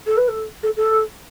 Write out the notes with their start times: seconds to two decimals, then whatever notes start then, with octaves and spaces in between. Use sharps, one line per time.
0.06 A4
0.17 B4
0.28 A4
0.63 A4
0.76 A4